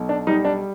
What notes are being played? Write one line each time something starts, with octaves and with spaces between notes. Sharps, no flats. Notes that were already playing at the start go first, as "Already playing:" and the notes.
Already playing: B1
D4
G3 D#4
D4